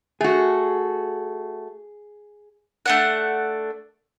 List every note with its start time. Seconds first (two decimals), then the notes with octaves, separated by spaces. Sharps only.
0.21 A3 F#4 G#4
2.86 A3 D4 F#5